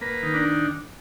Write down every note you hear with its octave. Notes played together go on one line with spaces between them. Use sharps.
A#3 B4
D#3
D4